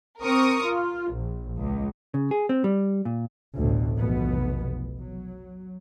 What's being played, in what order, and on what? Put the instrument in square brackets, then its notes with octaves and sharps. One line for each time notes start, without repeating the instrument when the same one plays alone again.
[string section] C4 A#4 C#6 D#6
F4
A#1
C#2
[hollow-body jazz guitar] C#3
G#4
C4
G3
A#2
[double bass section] A1 D2 B2
F1 B1 B2 E3 B3
F#3